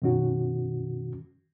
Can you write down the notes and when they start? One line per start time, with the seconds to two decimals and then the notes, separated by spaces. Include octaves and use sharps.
0.02 F#2 B2 D#3 C#4 F#4